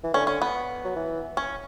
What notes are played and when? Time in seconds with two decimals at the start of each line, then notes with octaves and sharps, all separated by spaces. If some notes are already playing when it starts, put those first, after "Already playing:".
0.04 E3
0.14 D3 C#4
0.27 C#4
0.42 B3
0.85 F#3
0.96 E3
1.37 C#4